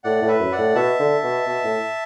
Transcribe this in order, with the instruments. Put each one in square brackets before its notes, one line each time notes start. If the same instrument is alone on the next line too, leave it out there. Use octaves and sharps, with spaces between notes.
[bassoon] A2 [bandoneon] D5 F#5
[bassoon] A2
[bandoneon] B4 E5
[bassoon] F#2
[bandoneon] D5 F#5
[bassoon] A2
[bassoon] B2 [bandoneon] E5 A5
[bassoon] D3
B2
B2
A2